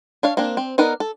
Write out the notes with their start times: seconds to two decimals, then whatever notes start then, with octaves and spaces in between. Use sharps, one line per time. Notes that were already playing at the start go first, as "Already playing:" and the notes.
0.23 D4 C#5 F5
0.37 A#3 C4 D4
0.57 C4
0.78 B3 D#4 A#4 B4 D5
1.00 A4